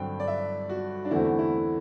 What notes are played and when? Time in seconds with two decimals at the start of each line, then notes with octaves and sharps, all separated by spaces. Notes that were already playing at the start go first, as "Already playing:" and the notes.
Already playing: G2 D3 F#3 C4 C5 G5
0.20 D5
0.27 E5
0.69 F#4
1.05 D4
1.11 E2 D3 A3 C4 E4 F#4
1.39 E4